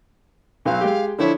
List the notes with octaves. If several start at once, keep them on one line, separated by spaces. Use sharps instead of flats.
B1 F#3 F5
G#3 G4
D3 F3 E4 C#5